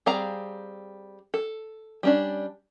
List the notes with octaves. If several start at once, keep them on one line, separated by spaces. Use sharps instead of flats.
G3 C4 G#4 F5 A#5
A4
G3 C#4 D4